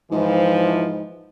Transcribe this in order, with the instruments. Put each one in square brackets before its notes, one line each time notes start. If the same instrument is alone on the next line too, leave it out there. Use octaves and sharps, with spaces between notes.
[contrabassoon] G#2 [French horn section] E3 F3